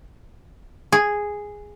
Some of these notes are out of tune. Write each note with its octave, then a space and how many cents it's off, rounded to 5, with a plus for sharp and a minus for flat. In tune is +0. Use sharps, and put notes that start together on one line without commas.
G#4 -5